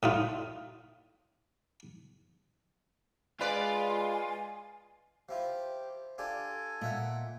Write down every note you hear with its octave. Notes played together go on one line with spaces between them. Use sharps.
A2 D#4 F4
G#3 F4 B4 D5 G#5
F3 E4 F4 G4
D4 F4 G4 A4 G#5
A#2 D#5 E5 F#5